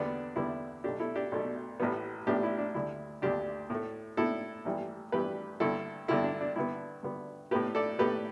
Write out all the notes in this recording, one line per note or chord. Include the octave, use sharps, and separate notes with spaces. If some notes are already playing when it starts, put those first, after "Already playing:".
Already playing: E2 D3 G3 B3 D4
E2 D3 G3 B3 E4
B1 B2 A3 D4 G4
E4 A4
D4 G4
B1 B2 A3
A1 A2 G3 B3
A1 A2 G3 B3 D4 G4
E4
D4
D2 D3 G3 E4
D2 D3 G3 D4 G4
A2 A3
A2 A3 E4 A4
A1 G2 E3 G3
A1 G2 E3 G3 G4 B4
G2 D3 A3 E4 A4
G2 D3 A3 E4
D4
D4
G2 D3 B3 E4
G2 D3 B3
A2 A3 G4 B4
A4 D5
A2 A3 G4 B4